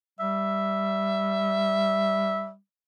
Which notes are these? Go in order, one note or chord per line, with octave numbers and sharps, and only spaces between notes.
G3 E5